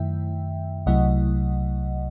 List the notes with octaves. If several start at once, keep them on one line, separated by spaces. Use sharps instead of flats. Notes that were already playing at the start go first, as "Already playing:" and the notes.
Already playing: F#2 D#3 A3 E4 E5 G5
C2 C3 F#3 A3 E4 D#5 F#5